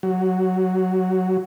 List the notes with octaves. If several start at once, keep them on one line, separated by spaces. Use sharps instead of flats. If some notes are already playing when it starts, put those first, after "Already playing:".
F#3